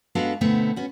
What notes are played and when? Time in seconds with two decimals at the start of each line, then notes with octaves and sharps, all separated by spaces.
0.15 G#3 B3 D4 F#4 A4 F5
0.41 B2 D3 A3 B3 C4
0.76 B3 C#4 F#4